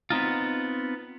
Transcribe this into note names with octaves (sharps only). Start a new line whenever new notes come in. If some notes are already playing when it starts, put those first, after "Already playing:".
B3 C4 D#4 F4